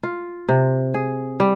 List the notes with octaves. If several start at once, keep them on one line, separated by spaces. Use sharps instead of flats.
F4
C3
G#4
G3